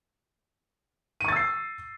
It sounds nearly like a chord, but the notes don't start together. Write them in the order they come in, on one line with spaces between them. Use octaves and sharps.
D#7 C#6 A6 E6 C7